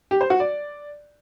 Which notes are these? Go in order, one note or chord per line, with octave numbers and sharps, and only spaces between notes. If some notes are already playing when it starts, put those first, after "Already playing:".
G4
C5
F#4
D5